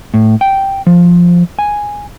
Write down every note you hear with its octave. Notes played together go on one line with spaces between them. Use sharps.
A2
G5
F3
G#5